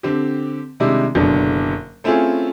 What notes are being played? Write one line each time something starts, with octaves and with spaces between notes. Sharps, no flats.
D3 C4 G4
C3 D#3 G3 G#3 D4 E4
F#1 B2 D3 D4
A3 C4 C#4 E4 F4 G#4